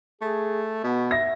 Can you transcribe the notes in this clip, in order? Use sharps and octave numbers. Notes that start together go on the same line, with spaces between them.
A3 G#4
B2 B3
E5 A#6